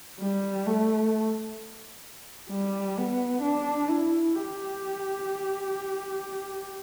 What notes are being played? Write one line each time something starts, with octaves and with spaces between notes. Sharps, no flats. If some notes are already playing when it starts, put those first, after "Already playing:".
G3
A3
G3
B3
D4
E4
G4